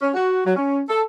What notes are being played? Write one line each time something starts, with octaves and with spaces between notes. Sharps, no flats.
C#4
F#4
F#3
C#4
A4